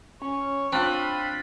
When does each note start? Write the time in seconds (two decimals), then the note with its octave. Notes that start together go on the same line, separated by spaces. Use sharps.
0.22 C#4 C#5
0.73 C4 D4 F4 B5